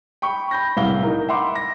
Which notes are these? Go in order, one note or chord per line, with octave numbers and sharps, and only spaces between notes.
G5 B5 C#6
B5 G6 A#6
D1 C2 E4 F5 F#5 G7
D#4 A#4
E5 F#5 B5 C6 D6
A#6